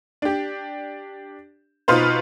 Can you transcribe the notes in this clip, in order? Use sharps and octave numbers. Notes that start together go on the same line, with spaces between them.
D4 G4
B2 D#4 F4 B4 C5